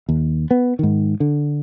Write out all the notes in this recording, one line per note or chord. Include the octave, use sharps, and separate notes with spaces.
D#2
B3
G#2 D#3
D3